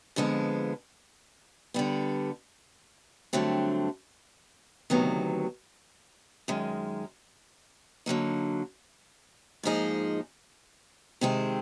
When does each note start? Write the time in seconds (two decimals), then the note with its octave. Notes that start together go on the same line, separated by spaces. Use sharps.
0.16 F2 D3 F3 G#3 B3
1.74 D3 G3 B3
3.33 G2 D3 F#3 A3 C4
4.90 D2 C3 D#3 F#3 B3
6.48 F#2 D#3 G#3
8.06 D3 F#3 A#3 D#4
9.63 G#2 F3 A#3 D#4 G#4
11.21 C3 D#3 G#3 C4